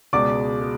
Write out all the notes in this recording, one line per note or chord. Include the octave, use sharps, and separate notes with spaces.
C#2 B2 G#3 D5 D6
G#3